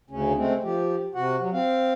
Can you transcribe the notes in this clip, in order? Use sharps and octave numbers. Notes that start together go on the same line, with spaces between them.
D2 C#3 C#4
G#3 A3 C4
F3 G4
C3 F#4 F#5
F#3
C4 F5